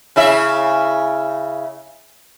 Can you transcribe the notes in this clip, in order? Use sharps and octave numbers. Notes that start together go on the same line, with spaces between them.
C#3 E4 E5